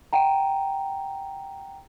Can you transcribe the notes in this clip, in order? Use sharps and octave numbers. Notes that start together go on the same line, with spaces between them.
F#5 G5 A#5